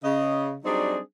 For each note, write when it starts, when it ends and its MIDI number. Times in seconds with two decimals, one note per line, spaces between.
0.03 0.56 49
0.03 0.56 75
0.65 0.98 54
0.65 0.98 55
0.65 0.98 60
0.65 0.98 62
0.65 0.98 63
0.65 0.98 68